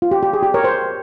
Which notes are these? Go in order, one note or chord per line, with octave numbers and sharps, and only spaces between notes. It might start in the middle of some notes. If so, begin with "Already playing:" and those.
F4
G4
G4
G#4
G4
A#4 C#5
C5